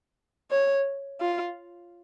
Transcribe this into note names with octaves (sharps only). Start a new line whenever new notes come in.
C#5
F4